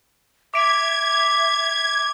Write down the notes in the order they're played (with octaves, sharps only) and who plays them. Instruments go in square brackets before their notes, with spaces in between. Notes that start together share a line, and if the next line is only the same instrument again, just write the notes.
[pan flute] E5 [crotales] D6 D7 F7 [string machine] G#6